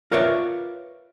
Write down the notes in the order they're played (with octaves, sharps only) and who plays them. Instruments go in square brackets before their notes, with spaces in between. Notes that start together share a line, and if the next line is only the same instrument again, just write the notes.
[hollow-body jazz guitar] F4 A#4 B4 C#5 D5 E5